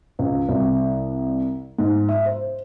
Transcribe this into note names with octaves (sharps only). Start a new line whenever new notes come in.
C#2
C2
G#2
E5
C5